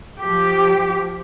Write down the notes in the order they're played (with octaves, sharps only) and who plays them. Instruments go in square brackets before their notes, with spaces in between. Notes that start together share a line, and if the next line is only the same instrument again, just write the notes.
[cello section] F3 G4